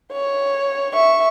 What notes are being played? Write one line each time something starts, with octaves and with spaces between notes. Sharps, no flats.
C#5
E5 C#6